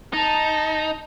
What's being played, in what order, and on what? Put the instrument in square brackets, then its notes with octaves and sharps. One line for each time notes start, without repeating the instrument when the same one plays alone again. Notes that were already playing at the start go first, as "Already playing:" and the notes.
[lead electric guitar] D#4 [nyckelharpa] A5